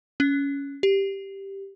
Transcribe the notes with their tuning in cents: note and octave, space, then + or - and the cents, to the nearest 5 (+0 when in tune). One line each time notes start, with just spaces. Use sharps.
C#4 +15
G4 +0